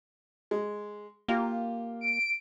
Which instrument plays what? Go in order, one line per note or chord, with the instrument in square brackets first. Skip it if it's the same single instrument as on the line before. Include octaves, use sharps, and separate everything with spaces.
[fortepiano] G#3
[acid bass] A#3 [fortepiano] F4 G4
[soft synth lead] D7